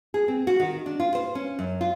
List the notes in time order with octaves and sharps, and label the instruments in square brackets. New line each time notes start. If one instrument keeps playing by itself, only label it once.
[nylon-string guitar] G#4
C4
F#4
D#3
D4
F4
C5
C#4
F#2
F4